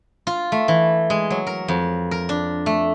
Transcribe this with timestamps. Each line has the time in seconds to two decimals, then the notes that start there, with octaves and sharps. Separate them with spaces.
0.27 F4
0.52 A3
0.68 E3
1.10 G#3
1.30 F#3
1.47 A#4
1.68 F2
2.11 A#4
2.29 D4
2.66 A3